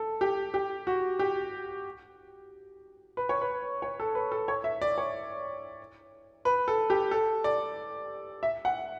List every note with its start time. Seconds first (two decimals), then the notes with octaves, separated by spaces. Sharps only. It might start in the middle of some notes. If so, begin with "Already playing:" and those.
Already playing: A4
0.21 G4
0.54 G4
0.87 F#4
1.19 G4
3.17 B4
3.29 C#5
3.42 B4
3.82 C#5
4.00 A4
4.15 B4
4.32 A4
4.48 C#5
4.64 E5
4.82 D5
4.98 C#5
6.45 B4
6.68 A4
6.90 G4
7.11 A4
7.44 D5
8.43 E5
8.65 F#5